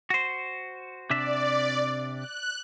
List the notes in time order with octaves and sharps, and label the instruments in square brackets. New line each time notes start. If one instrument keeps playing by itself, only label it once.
[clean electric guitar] F#4 C5
[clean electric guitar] C3 D4 E5 [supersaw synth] D5
[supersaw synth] F#6